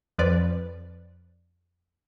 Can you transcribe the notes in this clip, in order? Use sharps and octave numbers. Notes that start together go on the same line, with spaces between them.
F2 F3 B4 D5